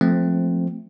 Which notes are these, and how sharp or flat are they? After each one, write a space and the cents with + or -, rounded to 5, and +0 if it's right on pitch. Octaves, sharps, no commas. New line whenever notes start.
F3 +10 A3 +0 C4 +0